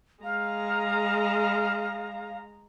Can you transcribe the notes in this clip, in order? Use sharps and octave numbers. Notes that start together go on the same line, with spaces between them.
G#3 F5 A#5